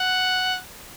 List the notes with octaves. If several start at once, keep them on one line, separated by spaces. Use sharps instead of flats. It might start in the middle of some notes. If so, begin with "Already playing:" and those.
Already playing: F#5